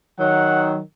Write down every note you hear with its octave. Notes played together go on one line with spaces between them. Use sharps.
D#3 F#3 F#5